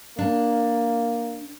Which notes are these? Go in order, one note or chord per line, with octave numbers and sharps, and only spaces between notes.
A#3 D4